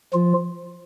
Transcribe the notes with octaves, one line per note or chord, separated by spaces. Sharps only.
F3 F4